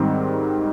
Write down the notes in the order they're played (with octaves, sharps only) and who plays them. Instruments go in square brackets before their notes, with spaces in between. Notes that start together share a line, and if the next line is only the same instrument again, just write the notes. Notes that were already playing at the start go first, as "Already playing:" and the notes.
Already playing: [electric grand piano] G#2 D#3 G3 C4